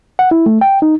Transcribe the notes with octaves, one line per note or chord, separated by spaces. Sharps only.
F#5
E4
A3
G5
D#4